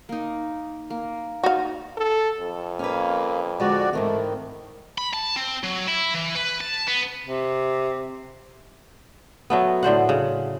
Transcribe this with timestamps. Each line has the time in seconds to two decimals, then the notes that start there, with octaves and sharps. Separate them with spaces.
0.09 A#3 D#4
0.90 A#3
1.44 D#4 F#4 F5
1.97 A4
2.40 F2
2.79 A#3 C#4 B4
3.60 D3 F3 G#3 F#4 D5
3.93 G#2 D#3 E3 A3 C4
4.98 B5
5.13 A5
5.36 C4
5.63 F#3
5.88 E4
6.14 E3
6.35 B4
6.61 A5
6.87 B3
7.26 C3
9.50 F#3 A3 B3
9.83 A2 D3 C5 F#5
10.09 C#3